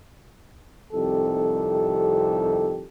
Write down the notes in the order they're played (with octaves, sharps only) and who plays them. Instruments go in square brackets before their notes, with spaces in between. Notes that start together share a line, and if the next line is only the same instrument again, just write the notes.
[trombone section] C2 F2 D#3 G4 A4